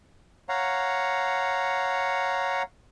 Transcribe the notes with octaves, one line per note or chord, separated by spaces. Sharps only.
C#5 F5 F#5 A#5